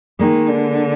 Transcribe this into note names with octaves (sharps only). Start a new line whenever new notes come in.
D#3 G#3 A#3
D3